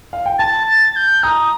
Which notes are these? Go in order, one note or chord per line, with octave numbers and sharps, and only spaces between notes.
F5
G5
A5 A6
A6
G6
A#5 D#6